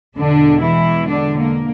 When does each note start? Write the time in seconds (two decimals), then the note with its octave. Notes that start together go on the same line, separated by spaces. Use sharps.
0.16 E2 B2 D3 G#3 D4
0.61 E3 E4
1.08 D3 D4
1.38 A#3